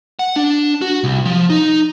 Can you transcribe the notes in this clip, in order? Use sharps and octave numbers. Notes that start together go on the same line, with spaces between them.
F#5
D4
F#4
C2
F3
D#4